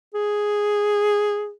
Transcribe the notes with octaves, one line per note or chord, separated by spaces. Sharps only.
G#4